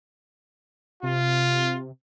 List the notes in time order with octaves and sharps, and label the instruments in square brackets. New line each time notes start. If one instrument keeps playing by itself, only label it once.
[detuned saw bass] C3 [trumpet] F4